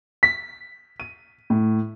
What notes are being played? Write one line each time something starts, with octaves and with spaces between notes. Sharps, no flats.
B6
D#7
A2